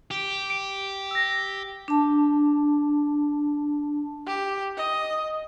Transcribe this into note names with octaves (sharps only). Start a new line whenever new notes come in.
G4
D7
E6 A#6
D4 A5
G4
D#5